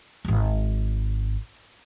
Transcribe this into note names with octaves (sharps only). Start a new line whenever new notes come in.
D1 G#1